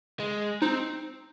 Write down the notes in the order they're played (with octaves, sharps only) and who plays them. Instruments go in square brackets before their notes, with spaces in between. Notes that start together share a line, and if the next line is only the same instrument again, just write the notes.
[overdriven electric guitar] G#3
[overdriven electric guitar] C4 [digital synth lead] D#4